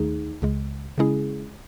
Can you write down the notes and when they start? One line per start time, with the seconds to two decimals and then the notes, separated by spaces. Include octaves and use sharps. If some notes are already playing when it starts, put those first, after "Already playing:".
Already playing: D#2 D#3 A3 D#4 G#4
0.42 C#2 C#3 G#3
0.98 C#3 G#3 C#4 E4 G#4